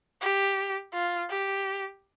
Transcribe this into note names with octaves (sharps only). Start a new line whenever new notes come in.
G4
F4
G4